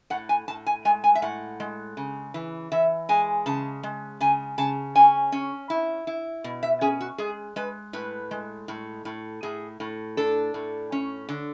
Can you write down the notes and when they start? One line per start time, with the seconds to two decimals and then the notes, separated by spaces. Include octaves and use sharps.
0.10 A2 F#5
0.29 G#5
0.48 A2 A5
0.66 G#5
0.85 G#3 G#5
1.04 G#5
1.15 E5
1.22 A2 F#5
1.60 G#3
1.97 C#3
2.34 E3
2.72 E3 E5
3.09 G#3 G#5
3.46 C#3 A5
3.83 G#3
4.21 C#3 G#5
4.58 C#3 A5
4.95 C#4 G#5
5.32 C#4
5.70 E4
6.07 E4
6.44 B2
6.63 E5
6.81 C#4 G#4
7.01 F#4
7.18 G#3 G#4
7.56 G#3 B4
7.93 A2 B4
8.31 G#3
8.68 A2
9.05 A2
9.43 A2 G#4
9.80 A2
10.17 D4 A4
10.54 A2
10.92 C#4
11.29 D3